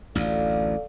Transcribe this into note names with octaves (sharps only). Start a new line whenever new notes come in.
A1 D2 A4 D5 F5